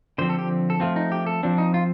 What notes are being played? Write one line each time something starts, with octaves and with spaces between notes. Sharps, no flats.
D3 F3 C4 C5
A4
G4
A4
F3 A3 C4 F4
D#4
G4
A4
F3 C4 D4
D#4
F4